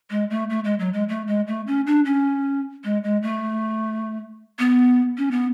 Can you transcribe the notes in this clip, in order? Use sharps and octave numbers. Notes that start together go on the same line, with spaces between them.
G#3
A3
A3
G#3
F#3
G#3
A3
G#3
A3
C#4
D4
C#4
G#3
G#3
A3
B3
C#4
B3